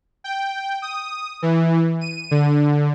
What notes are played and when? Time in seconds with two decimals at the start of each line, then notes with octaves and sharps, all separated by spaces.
0.24 G5
0.82 D#6
1.42 E3
2.01 D#7
2.31 D3